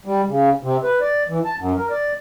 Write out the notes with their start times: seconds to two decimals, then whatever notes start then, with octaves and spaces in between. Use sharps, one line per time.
0.05 G3
0.27 C#3
0.63 C3
0.84 B4
1.01 D5
1.28 E3
1.45 A5
1.59 F#2
1.77 A#4
1.90 D5